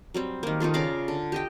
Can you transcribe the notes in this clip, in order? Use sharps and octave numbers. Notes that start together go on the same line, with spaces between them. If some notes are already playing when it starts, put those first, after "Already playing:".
F#3 G3 C4
D#3 A#3
D#3 D#4 F4 A4
C#3 D5 F5 A#5
D3
G4 D#5 G5